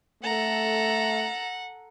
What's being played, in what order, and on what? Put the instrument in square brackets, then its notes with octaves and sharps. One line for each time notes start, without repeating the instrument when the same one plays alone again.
[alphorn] A3 [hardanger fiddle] A4 A#5 [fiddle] F#5